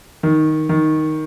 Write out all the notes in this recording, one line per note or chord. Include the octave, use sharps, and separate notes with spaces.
D#3
D#3